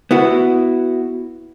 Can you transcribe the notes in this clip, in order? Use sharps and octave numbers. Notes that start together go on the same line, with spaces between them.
B3 E4 F#4